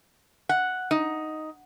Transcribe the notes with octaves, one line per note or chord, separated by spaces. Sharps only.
F#5
D#4